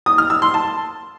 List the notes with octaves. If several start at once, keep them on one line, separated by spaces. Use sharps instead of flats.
D#6
F6
E6
C6
A5